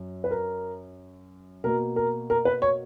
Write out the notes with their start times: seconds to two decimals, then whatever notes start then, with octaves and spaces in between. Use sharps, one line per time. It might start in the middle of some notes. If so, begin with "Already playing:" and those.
Already playing: F#2
0.24 B4
0.31 A#4
1.64 B2 A#3 A#4
1.96 A#4
2.30 A#4
2.45 B4
2.62 C#5